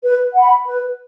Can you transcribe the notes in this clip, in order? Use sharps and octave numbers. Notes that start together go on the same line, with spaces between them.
B4
F#5 B5
B4